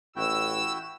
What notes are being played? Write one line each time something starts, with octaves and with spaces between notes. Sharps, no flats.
A1 E4 F#4 G5 E6